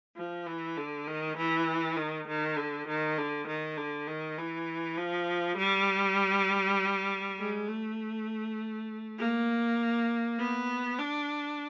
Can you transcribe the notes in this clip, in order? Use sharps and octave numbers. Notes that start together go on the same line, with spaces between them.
F3
E3
D3
D#3
E3
D#3
D#3
D3
D#3
D3
D#3
D3
D#3
E3
F3
G3
G#3
A3
A#3
B3
D4